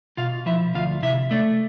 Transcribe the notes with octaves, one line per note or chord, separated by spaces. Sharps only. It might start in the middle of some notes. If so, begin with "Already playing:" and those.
B2 F4 F5
F3 E4 E5
D2 F4 F5
C3 E4 E5
A3 D4 D5